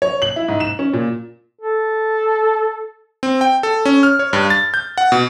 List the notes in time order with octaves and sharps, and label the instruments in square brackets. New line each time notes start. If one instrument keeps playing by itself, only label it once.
[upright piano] C#5
F#7
E4
G#2
E7
C#4
A#2
[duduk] A4
[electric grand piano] C4
G5
A4
C#4
F6
C#5
G2
A6
G6
F#5
B2